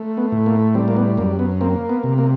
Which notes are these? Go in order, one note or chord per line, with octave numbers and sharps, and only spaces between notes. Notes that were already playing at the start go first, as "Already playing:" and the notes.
Already playing: A3
B3
A2
A#3
G3 C4
A#3
B3
F#2 A#3
B3
A#3 C4
B3
C3
A#3